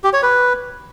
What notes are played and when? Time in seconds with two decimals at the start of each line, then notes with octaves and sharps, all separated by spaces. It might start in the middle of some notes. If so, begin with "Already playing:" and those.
0.04 G4
0.13 C#5
0.23 B4